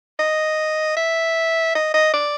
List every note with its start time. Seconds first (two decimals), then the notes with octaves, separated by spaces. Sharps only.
0.20 D#5
0.97 E5
1.75 D#5
1.94 D#5
2.14 D5